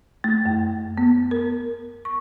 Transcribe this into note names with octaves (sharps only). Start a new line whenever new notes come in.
A3
F#2
B3
A#4
C#6